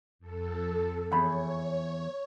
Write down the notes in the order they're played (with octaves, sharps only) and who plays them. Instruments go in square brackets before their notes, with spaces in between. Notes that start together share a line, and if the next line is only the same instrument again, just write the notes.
[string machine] F2 A4
[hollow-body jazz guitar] E2 B5 [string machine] C#5